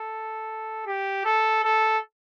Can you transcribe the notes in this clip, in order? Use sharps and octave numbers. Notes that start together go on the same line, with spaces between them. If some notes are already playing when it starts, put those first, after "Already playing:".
Already playing: A4
G4
A4
A4